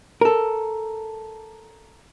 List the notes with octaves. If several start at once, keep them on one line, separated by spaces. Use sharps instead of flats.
A4 A#4